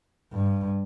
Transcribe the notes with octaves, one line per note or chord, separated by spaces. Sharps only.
G2